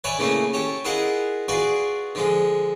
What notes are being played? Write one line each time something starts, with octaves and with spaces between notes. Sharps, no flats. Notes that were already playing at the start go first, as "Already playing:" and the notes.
B4 C#5 D5 E5 G#5 B5
C#3 E3 A3 A#3 C#4
C#4 G4 A4
E4 F4 G#4 A#4 D#5 F#5
F4 F#4 G#4 B4 D5
D3 F3 G#3